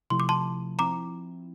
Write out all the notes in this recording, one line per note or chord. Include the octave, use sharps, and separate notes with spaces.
C3 F3 A3 E4 C6
D6
A5 C6
F3 C4 E4 A#5 D6